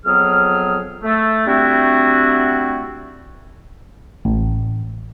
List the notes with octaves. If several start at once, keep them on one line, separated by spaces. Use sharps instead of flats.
F2 F#3 B3 G#4 F6
A3
G3 A3 C4 D4 E4 F#4
A1